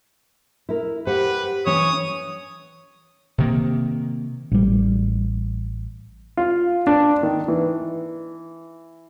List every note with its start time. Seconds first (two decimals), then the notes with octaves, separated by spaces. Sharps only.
0.69 E4 A#4
1.07 G4 B4 C5 F#5
1.66 E3 C#4 C#5 D#6
3.38 C3 D#3 A#3
4.52 A1 G3
6.37 F4
6.87 D4
7.23 D#3
7.48 E3